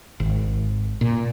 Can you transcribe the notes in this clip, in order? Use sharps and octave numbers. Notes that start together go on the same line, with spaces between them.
G#1
A#2